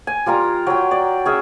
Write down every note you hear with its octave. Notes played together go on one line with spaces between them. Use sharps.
G#5
G3 F4 A#4 A#5
F#3 G5
D5
C#4 G#4 E5